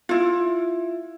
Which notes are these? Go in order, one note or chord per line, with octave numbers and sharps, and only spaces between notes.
E4 F4